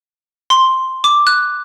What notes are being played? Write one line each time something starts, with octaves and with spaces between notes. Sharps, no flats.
C6
D6
F#6